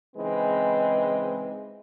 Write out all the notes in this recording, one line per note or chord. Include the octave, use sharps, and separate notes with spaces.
C#3 E3 G#3 C4 D#4 B4